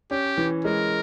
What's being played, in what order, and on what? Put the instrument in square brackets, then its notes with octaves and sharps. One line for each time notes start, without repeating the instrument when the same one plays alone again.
[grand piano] C#4 [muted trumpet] G4
[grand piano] E3
[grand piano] G#3 [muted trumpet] A#4